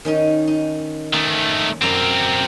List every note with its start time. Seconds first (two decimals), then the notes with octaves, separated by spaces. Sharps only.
0.05 D#3 C#4 D#4
0.47 D#4
1.14 D#3 A3 G#5
1.82 F#2 C4 A#4 D5 G#5